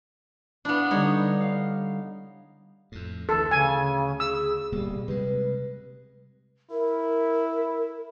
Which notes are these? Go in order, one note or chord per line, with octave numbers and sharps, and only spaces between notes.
B3 D4 E4 F5
D3 G3 D#4 C#5
F5
F2 A2
D2 E3 A4
C#3 G#5
G#4 E6
D1 B2 G3 A#3
C3 G3 G#3 B4
E4 A#4